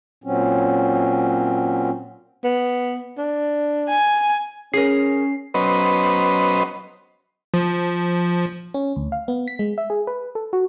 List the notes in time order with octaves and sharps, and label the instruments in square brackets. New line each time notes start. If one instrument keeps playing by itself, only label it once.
[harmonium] A#2 F#3 C4 C#4
[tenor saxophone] B3
D4
[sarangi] G#5
[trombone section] C#4 [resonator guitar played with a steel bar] G#4 A#4 [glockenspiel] C7
[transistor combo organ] F#3 B3 C#4 B4 C5 D#5
[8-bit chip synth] F3
[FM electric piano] C#4
D2
F5
B3
B6
G#3
E5
G#4
B4
A4
F#4